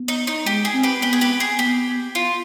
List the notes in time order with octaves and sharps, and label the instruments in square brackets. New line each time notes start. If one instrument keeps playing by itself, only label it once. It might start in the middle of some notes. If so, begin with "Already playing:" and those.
Already playing: [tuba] B3
[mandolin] D#4
D#4
[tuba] G#3 [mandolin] G4
[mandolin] G#4
[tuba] C4
[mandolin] G4 B4
[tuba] B3 [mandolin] G4 B4
[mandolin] G#4
G4 B4
G#4
[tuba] B3 [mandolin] G4
[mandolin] F4